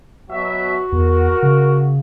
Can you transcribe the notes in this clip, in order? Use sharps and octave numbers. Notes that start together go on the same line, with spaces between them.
B2 F#3 F#4 E5
E2 A#4
C#3